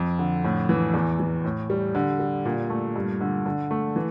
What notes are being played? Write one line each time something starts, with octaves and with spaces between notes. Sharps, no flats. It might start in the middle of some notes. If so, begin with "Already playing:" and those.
Already playing: F2
D3
A2
E3
E2
E3
A2
G3
D3
G3
A#2
A3
G2
D3
D3
A3
E3